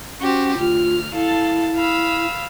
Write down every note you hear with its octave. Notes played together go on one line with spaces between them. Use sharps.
C#4 F#4 G4 C5
D2 F4 F6
E4 A4 F5 A5
F5 B5 E6